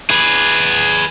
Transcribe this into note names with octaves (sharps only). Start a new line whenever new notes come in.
G#4 B4